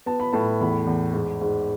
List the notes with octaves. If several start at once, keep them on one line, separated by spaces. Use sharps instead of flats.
B3 A5
B5
A2 A5
E2 B5
E2
G#2
G#2